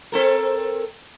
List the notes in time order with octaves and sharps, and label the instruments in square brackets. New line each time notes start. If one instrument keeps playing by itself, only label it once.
[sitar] C4 A4 A#4